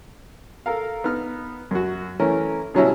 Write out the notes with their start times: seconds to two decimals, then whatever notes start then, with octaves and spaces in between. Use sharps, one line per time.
0.66 A4 A#4 F5
1.04 B3 D#4 F6
1.71 F#2 F#4
2.19 E3 A3 C#4 A#4
2.74 B2 D3 F#3 G3 C#4 E4